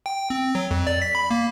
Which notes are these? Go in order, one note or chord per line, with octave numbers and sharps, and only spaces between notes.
G5
C4
F#3
F2
D5
B6
B5
A#3